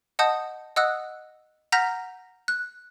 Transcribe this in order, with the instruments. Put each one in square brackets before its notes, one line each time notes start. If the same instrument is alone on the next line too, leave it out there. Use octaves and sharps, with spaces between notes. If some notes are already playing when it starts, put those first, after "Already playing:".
[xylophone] D#5 F#5 A5 D#6 G6
D#5 F#5 D#6 E6 F#6
F#5 A#5 F6 G6 A#6 B6
F#6